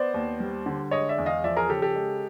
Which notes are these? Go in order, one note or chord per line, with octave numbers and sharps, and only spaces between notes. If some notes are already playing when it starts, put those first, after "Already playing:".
Already playing: B3 C5 D5
D#2
G3
D3
G#3 C#5 D#5
D5 E5
E2
D#5 F5
F3 D5 E5
G#4 A#4
C#3 G4 A4
G4 A4
G#3